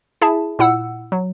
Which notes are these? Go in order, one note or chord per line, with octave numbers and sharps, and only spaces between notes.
E4 G#4 E5 A5
A#2 E4 F#5 E6
F#3